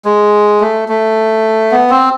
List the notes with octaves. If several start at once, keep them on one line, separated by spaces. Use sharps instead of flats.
G#3
A3
A3
B3
C4